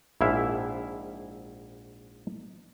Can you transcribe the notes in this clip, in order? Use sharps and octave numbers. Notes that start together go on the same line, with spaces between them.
A#1 G#2 E4 E5 F5